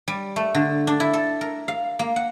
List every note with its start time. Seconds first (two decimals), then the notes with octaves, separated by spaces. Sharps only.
0.08 G3
0.36 A3
0.55 D3
0.87 D4
1.00 E4
1.13 A4
1.41 A#4
1.68 F5
1.99 A#3
2.16 F#5